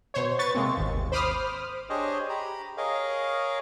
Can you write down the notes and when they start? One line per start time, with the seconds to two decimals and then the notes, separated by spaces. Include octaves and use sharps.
0.14 B2 C5 C#5
0.39 B4 C#6 A6
0.55 C3 G#3 A#3 C4
0.77 G#1 D#2
1.12 C5 B5 D6 D#6 F6
1.90 D4 G4 G#4 C5 C#5 D#5
2.29 G4 A#5 B5
2.77 G#4 A#4 C#5 D#5 F5